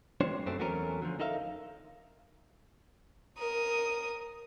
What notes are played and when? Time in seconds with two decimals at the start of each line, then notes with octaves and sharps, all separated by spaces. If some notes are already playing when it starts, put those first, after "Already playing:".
0.21 G3 C#4 D4 C5 C#5
0.46 F#2 A3 C4
0.59 E2 F#3 A3 C4 C#4 A#4
1.02 D3 F3
1.20 D#4 A4 A#4 E5 F5
3.38 A#4 D#6